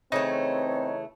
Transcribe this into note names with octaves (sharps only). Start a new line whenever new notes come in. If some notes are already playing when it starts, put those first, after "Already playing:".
C#3 E3 A3 C4 D#4 C#5